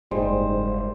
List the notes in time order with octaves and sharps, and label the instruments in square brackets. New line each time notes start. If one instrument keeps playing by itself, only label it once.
[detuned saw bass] F#1 [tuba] G#2 [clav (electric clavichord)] G3 G#3 [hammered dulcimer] C5